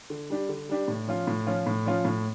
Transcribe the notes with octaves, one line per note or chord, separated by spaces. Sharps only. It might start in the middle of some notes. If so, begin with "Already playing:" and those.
D3
G3 D4 G4
D3
G3 D4 G4
A2
F3 C#4 F4
A2
F3 C#4 F4
A2
F3 C#4 F4
A2